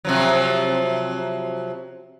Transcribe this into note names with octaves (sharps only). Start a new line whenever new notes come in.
C3 F3 F#3